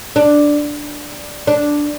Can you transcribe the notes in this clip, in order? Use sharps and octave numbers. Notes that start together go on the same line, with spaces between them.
D4
D4